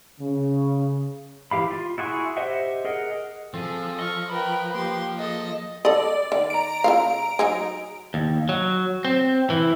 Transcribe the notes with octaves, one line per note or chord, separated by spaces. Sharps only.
C#3
E3 G4 F5 B5
F4
E4 F#4 G#4 C6
G4 C5 D#5 E5 F#5
G#4 A#4 D#5 F#5
F3 C4 F4 G#4 A4
D#5 C#6 F6
A#4 B4 G5 B5
A#3 G4 C6
G#4 A4 D#5
A4 D5 D#5
D#3
A#5 D7
C#3 F4 F5
F#3 D#4 G#4
D#2
F#3
C4
E3